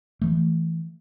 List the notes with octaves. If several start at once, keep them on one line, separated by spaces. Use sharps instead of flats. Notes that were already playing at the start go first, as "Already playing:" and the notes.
E3 A3